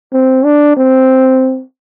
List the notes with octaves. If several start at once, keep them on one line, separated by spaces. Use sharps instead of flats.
C4
D4
C4